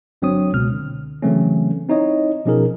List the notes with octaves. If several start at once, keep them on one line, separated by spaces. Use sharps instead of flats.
G1 F#3 C4 D4 C#5 D#6
C#2 B2 F6
D3
C#3 E3 F#3 A3 C4 C#4
C4 D#4 E4 C#5 D#5
B2 F3 C#4 D#4 G#4 A#4